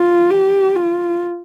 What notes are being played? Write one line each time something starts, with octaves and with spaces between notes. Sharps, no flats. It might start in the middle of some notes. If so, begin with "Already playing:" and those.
Already playing: F4
G4
F4